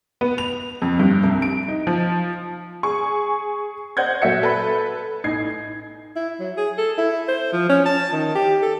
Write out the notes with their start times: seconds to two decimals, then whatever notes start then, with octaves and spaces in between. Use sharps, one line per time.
0.21 B3
0.38 F7
0.82 F2
0.99 G2
1.23 C2
1.42 D7
1.68 D#4
1.87 F3
2.83 G#4 G#5 C#6
3.97 C5 D#5 F#5 G6 G#6
4.22 A#2 F#3 A3 F#4 E5 C#7
4.43 A4 B4 B5
5.24 A1 D#4 G#6 C7
6.16 E4
6.40 F#3
6.57 G#4
6.78 A4
6.98 E4
7.28 C5
7.53 F3
7.69 C#4
7.86 A5
8.13 D#3
8.35 G4
8.63 A4